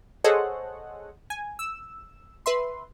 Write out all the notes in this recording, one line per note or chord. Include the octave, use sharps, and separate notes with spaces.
G#4 A4 C5 C#5 D#5 F#5
G#5
E6
B4 E5 C6